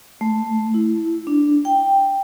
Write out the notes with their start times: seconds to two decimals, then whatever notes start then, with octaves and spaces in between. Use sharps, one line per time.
0.21 A3
0.74 E4
1.27 D4
1.65 G5